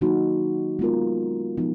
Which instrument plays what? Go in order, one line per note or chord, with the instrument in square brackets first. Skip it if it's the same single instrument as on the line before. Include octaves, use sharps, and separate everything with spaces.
[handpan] D#3 F#3 A#3 D#4 F#4
G#3 B3 F4 A#4
F3 B3 D#4